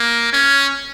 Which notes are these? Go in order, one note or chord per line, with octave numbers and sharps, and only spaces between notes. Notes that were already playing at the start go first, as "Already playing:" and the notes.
Already playing: A#3
C#4